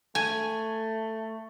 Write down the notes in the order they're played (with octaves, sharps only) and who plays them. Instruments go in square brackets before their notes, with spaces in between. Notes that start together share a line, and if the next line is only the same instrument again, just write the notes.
[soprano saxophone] A3 [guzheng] G#5